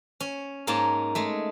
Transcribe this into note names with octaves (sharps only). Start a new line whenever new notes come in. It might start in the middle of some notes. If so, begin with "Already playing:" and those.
C#4
G#2 A#3 C#4 A5
G#3 A3